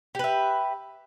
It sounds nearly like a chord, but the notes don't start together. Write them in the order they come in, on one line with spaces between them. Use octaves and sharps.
G4 B4 E5